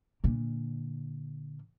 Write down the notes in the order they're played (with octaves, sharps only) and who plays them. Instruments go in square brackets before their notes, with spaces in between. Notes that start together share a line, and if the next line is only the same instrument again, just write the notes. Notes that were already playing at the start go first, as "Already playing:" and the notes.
[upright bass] A#2 D3